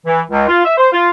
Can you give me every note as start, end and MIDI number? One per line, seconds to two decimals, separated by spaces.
0.06 0.21 52
0.30 0.47 37
0.47 0.64 65
0.65 0.73 76
0.78 0.88 72
0.92 1.10 65